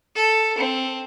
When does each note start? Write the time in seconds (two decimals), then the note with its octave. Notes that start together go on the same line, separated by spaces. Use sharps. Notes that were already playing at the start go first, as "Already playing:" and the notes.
0.15 A4
0.58 C4